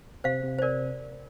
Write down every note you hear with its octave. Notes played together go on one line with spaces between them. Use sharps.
C3 C5 F5
C3
C5
A#4 D5